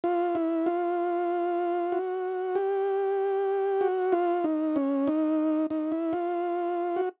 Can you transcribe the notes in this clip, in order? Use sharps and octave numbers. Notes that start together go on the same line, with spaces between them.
F4
E4
F4
F#4
G4
F#4
F4
D#4
C#4
D#4
D#4
E4
F4
F#4